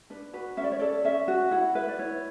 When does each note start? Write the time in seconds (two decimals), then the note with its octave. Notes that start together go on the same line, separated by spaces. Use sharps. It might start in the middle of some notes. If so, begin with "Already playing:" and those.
0.10 D4 B4
0.33 F#4 B4
0.57 C#4 E5
0.64 D5
0.72 C#5
0.79 A4 D5
1.05 C#4 E5
1.28 F#4
1.51 E4 F#5
1.75 B4 E5
1.88 D5
1.99 E4 C#5